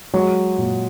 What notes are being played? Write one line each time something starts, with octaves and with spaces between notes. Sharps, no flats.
F#3 G#3
A#2